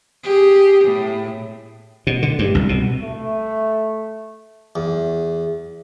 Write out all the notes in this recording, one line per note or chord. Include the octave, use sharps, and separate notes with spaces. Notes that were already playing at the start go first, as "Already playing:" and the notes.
G4 G#4
A2
B2
D3
G2
C2
B2
A3
E2